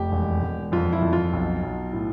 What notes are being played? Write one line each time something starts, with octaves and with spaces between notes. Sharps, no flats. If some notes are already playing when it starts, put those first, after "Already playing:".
Already playing: F1 G4
E1
E1
F2 F4
E4
F2
F4
B1
B1
A2